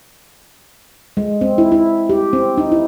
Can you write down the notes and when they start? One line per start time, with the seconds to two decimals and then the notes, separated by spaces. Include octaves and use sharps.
1.17 G#3
1.41 C4
1.58 E4
1.72 E4
2.09 G4
2.33 C4
2.58 D#4
2.72 E4